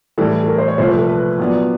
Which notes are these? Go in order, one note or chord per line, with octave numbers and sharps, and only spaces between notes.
A2 E3 G3 A4
A4
A#4
C5
C#5
C2 A#2 F3 A3 C5
B4
A4
B4
A#2 F#3 B3 D4